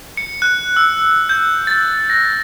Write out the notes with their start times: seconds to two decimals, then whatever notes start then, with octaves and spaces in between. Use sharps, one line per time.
0.17 C#7
0.42 F#6
0.77 E6
1.29 G6
1.67 A6
2.10 A#6